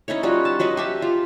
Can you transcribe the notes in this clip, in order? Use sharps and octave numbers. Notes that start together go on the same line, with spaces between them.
C#4 D#4 E4 C#5
G3 C#4 F4 F#4
A5
F#3 B4 D#5 C#6
G4 E5 A5
F4